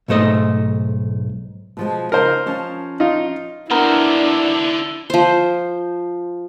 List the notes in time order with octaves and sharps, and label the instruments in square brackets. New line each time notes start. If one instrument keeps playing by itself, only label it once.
[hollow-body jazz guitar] B1 G#2 A3 C5 D#5
[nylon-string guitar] B2 F3 G#3
[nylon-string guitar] C#3 D#4 G#5 [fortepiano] A#4 C5
[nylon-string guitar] F3 C#4 A5
[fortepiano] D#4 F4
[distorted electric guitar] D3 C5 [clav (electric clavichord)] B3 A#4 [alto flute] D4 [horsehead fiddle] E4
[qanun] F3 C5